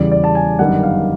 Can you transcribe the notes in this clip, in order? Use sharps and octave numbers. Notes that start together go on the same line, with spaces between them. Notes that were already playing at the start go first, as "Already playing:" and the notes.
Already playing: E2 C#3 E3 G3 D5
D5
A5
G#5
G1 F#2 D#3 G3 F#5
F5